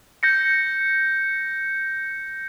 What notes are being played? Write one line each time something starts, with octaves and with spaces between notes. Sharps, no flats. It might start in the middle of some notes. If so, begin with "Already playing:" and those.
G6 A#6 C#7